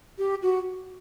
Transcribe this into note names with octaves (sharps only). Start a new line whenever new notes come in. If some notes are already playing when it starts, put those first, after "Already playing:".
G4
F#4